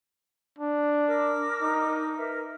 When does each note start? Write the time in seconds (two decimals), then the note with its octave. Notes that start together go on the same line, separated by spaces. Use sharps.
0.59 D4
1.07 A#4 D6 E6
1.62 D#4
2.17 A#4 B4 E5